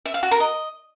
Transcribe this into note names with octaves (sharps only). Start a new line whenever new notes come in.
E5
F5
F#4
A#4
D#5